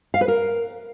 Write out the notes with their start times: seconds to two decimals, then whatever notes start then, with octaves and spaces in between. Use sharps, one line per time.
0.14 F5
0.21 B4
0.28 A#4